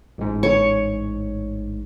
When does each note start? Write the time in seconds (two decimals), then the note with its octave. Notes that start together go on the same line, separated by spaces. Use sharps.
0.18 A1 G#2
0.43 C#5